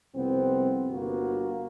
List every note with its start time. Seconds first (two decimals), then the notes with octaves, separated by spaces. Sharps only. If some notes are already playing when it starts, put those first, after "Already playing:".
0.15 C2 F2 B3 C4
0.90 G1 A#3 B3 F#4